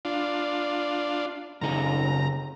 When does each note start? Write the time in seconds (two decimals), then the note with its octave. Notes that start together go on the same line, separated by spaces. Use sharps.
0.05 D4 F4
1.61 F#2 C#3 D#4 A#5